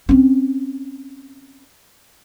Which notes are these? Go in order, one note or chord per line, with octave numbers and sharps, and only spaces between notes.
C4 C#4